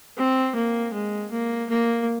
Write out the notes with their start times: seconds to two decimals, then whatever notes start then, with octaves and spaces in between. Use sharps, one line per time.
0.18 C4
0.55 A#3
0.93 G#3
1.32 A#3
1.70 A#3